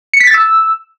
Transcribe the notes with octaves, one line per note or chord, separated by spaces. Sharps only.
C#7
B6
A6
E6